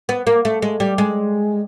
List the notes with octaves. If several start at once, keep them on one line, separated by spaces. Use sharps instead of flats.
B3
A#3
A3
G#3
G3
G#3